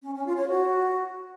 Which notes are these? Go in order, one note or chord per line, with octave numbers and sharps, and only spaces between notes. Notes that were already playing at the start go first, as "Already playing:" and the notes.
C#4
C#4
F4
C#5
F#4